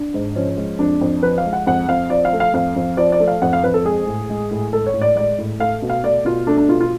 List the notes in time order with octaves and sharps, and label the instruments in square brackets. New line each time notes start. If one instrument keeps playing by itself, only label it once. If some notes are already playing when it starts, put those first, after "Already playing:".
Already playing: [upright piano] D4
G#2
F3 C#4
G#3
F2 D4
F2
F3 B4
F5
G#3
F#5
F2 F#5
F2 F5
F3 D5
F5
A3
F5
F2 F5
F2
F3 D5
D5
A3
F5
F2 F#5
F5
F2 B4
A4
G#3 G#4
A2
G#3
A2
G#3 A4
C#5
A2
D5
G#3 D5
A2
A3 F5
B2
F5
A3 D5
B2 F4
A3 D4
D4
B2 F4
F4